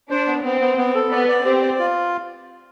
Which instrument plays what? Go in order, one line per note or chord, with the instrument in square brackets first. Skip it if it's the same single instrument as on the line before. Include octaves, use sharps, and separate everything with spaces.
[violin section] D4 [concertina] C5
[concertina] B3
[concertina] B3 [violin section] C4
[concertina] B3
B3
A4
[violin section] B3 [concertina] D5
[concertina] D5
[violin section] C4 [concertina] G4
[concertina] D5
F4